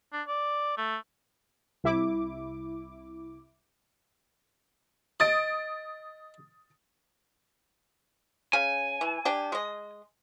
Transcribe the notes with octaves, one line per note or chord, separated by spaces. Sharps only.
D4
D5
A3
C2 E4 D6
D#5 D#6 A6 D7
C#3 G#5
E3
D4 G4
G#3 D#5